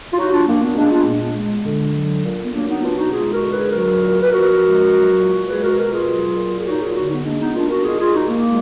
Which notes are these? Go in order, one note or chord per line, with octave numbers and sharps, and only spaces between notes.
F4
F#3 D#4 F#4
D4 F4
A#2 A#3 D4
B3
G#3 A#3 D4
D4 F4
A#2
B3
G#3
D3
F#3
A#2
B3
F#3 A#3 D4
B3 D#4
B2 D4 F4
D#4 F#4
G#3 F4 G#4
F#4 A#4
D3
G#4 B4
F#3 F#4 A#4
A#2
B4
F3 F#4 A#4
G#3
F#3
A#2
G#3 G#4 B4
F#4 A#4
B2 F#4 A#4
F4 G#4
F#3
A#2
G#4
F#3 D#4 F#4
F4 G#4
D3 D#4 F#4
B3 D#4
G#3 A#3 D4
B3 D#4
A#2 D4 F4
F#4 A#4
G#3 F4 G#4
F4 G#4
A#2 D#4 F#4
A#3
G#3